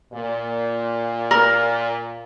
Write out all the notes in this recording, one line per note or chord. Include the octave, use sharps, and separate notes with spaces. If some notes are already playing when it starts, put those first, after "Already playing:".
A#2
A#4